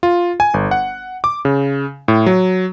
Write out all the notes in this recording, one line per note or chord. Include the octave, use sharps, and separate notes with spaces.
F4
G#5
G1
F#5
D6
C#3
A2
F#3